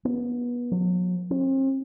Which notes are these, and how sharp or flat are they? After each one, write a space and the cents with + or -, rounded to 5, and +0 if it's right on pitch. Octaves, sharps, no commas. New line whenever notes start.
B3 -25
F#3 -40
C4 +40